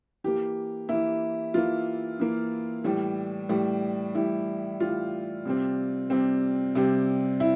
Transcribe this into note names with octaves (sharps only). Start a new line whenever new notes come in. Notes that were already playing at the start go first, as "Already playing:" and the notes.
E3 A#3 G4
E3 A#3 E4
E3 A#3 F4
E3 A#3
A2 E3 G3
A2 E3 G3
A2 E3 G3 E4
A2 E3 G3 F4
C3 G3 C4
C3 G3 C4
C3 G3 C4
E4